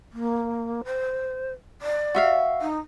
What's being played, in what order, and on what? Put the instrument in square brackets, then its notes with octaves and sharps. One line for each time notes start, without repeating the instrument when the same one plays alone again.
[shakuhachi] A#3
C5
D5
[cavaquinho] F#4 E5 F5
[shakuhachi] D#4